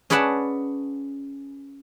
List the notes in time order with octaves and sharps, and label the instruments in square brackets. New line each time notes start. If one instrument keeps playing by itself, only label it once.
[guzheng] C#4 G#4 B4 D5 F#5 A5